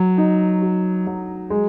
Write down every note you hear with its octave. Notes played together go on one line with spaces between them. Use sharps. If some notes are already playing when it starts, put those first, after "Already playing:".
Already playing: F#3
D#4
F#4
F#3
G#3